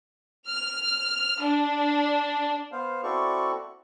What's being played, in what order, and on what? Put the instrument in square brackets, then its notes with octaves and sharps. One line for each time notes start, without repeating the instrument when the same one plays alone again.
[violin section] F6
D4
[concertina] B3 C5 F5
C4 E4 F#4 A4 D5 C#6